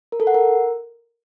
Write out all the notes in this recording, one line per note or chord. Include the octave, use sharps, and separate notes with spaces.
A#4
A4
F#5
A#4